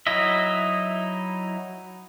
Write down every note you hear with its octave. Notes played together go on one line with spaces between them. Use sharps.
F#3 D#4 E4 D#5 E5